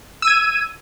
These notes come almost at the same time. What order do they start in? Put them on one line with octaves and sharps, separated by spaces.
E6 D#7 G#6